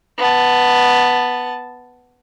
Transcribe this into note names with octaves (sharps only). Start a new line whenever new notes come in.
B3 A5